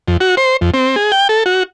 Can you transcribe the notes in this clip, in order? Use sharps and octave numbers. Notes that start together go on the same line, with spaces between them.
F2
F#4
C5
F2
C4
G#4
G5
A4
F#4